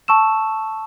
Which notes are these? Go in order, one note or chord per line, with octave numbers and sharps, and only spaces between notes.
A5 C#6 E6 E7